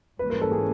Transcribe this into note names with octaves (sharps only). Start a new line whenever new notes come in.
G#2 E3 G3 A#3 C#4 B4
A#4
A4
G#4